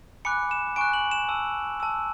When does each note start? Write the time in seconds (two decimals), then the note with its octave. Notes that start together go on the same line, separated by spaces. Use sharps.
0.25 G#5 B5 D6 F#6 C#7
0.51 E7
0.76 G#5 C#6 F#6 D7
0.93 F#7
1.11 E7
1.29 A5 E6
1.80 A5 E6